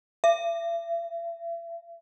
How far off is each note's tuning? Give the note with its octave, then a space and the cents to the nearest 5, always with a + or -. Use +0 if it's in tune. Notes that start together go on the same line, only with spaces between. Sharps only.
E5 +40